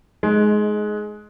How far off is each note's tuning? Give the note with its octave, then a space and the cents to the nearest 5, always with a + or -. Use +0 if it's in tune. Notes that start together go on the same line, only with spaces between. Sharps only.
G#3 +20 D#4 +0